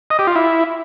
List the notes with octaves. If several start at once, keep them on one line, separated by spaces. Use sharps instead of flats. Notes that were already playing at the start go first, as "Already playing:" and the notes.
D#5
G4
F4
E4